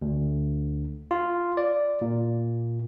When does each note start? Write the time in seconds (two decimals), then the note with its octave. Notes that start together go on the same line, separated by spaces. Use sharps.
0.02 D2
1.11 F4
1.57 D5
2.01 A#2